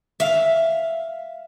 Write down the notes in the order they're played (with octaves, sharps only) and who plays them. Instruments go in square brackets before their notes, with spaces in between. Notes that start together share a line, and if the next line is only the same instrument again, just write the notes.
[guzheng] E5 F5